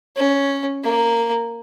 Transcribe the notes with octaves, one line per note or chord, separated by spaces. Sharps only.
C#4
A#3